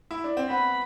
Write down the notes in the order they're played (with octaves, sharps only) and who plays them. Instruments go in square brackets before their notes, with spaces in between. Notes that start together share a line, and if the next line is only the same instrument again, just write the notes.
[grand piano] E4
D4
C4
[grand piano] B3 [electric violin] B5